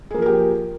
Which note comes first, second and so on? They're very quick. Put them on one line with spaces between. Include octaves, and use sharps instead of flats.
G#4 A#3 F3 A#4 G4